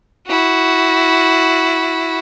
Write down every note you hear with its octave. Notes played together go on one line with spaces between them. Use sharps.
E4 F#4